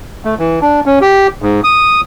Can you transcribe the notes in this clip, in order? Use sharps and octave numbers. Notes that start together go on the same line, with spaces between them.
A3
E3
D4
C#4
G4
G#2
D#6